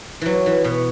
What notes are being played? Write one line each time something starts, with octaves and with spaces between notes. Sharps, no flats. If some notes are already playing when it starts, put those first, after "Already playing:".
E3 F#3
E3
B2